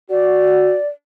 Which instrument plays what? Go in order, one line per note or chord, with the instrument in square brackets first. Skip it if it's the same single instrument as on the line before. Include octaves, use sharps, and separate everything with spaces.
[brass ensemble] F#4 [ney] D5